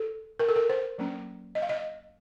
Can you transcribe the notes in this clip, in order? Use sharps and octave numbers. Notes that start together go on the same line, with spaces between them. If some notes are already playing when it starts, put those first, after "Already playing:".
Already playing: A4
A#4
A4
A#4
C5
F#3 A#3 C#4
D#5
F5
D#5